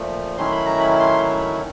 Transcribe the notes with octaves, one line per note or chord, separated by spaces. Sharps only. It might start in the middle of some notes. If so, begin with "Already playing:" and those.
Already playing: A#2 F3 A3
D#3 F#3 A3 C#4 E4 C6
B5
A#5
B5
C6